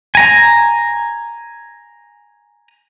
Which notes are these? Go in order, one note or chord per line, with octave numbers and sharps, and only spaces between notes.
G#5 A#5